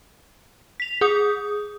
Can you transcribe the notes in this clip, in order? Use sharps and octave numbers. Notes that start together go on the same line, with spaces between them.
B6 F7
G#4 D#6